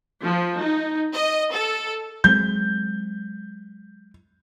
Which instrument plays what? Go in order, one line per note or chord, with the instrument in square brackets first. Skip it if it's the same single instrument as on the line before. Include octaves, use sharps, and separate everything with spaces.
[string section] F3
D#4
D#5
A4
[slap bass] F#3 G#3 C4 [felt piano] G6